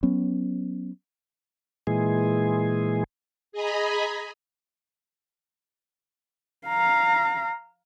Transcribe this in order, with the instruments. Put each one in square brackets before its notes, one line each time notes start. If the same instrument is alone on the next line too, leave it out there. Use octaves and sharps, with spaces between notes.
[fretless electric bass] F#3 B3 C#4
[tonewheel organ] A#2 E3 G#3 G#4
[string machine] G#4 D#5 G#5 A#5 B5
[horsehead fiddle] F5 A#5